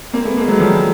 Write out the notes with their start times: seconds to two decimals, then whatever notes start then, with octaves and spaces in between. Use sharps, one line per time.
0.13 A#3 C4
0.25 A3 B3
0.37 G#3 A#3
0.48 F#3 G#3
0.60 F3 G3